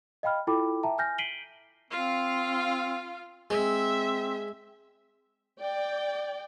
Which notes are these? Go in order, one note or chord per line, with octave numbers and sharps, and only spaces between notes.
D#5 F5 G5 B5 F6
E4 F4 A4 G5 B5 D6
E5 G5 A5 A#5
G#5 F6 G6 A#6
B6 C7 D7 D#7 F#7 G7
C4 F4 F5
G#3 C4 E5
D5 G5